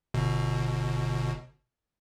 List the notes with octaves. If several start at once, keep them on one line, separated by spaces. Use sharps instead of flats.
G1 B2